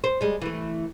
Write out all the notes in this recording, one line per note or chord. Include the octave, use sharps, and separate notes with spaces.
C5
G3 G#3
E3 A3